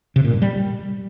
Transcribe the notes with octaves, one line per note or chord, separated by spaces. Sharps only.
C3
A#2
G2
G3